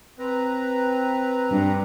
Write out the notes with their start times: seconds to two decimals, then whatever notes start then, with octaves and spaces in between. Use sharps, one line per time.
0.19 C4 B4 A#5
1.51 G2